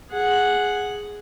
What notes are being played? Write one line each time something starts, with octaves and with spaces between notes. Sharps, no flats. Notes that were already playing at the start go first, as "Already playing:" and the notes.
G#4 F#5